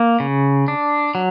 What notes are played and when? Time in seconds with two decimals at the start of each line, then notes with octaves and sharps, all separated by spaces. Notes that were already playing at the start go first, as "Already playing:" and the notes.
Already playing: A#3
0.20 C#3
0.68 D4
1.15 F#3